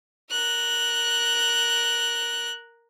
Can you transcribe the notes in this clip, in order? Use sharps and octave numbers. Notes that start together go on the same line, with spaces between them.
A#4 F#6